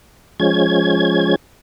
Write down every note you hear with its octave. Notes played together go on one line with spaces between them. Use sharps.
F3 G#3 C#4 G#6